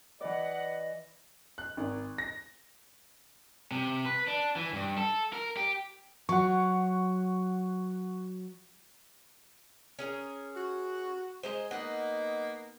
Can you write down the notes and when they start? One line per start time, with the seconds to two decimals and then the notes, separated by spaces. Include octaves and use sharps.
0.21 E3 B4 D5 D#5 F#5
1.58 F#6
1.77 G#1
2.18 A#6
3.72 C3
4.06 B4
4.28 D4
4.56 E3
4.73 G2
4.97 A4
5.33 A#4
5.57 G4
6.29 F#3 F#5 C#6
9.99 C#4 G#4 A#4
10.55 F#4
11.43 G#3 C5 D#5 A#5
11.71 A#3 B3 D#4 D#5 F#5